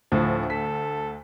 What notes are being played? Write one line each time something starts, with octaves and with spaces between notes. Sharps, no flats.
D2 A2 F3
A4 B6